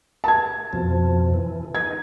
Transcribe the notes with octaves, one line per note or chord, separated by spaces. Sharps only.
A5 G#6
F2 B2 F3
E3
D#4 G#6